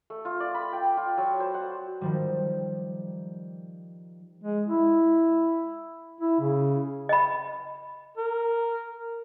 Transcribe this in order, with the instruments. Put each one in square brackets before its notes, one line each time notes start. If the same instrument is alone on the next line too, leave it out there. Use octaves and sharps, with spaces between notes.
[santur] A3
F4
D5
B5
G5
F4
F#3
C5
F#5
[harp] D#3 F3 G3
[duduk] G#3
E4
E4
C#3
[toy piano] D#5 B5
[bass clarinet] A#4